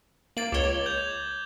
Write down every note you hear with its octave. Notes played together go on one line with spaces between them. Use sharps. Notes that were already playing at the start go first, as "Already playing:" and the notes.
A#3 A6 D7 F#7
C#2 C#5 D6 G7
G6 G#6 F7